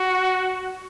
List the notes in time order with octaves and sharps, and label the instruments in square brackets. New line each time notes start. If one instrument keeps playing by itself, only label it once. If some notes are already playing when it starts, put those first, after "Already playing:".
Already playing: [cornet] F#4